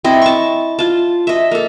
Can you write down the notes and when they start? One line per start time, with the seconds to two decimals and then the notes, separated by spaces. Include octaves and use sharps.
0.04 C4 E4 D#5
0.22 A5 C#6
0.79 F4 A5
1.27 D#5 E5
1.51 A#3 A4